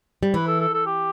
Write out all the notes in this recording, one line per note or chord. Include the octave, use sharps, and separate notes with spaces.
G3
E3 B4
A4
A4
A4
G4